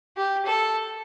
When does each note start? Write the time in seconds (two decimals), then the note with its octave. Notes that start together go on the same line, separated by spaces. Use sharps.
0.17 G4
0.45 A4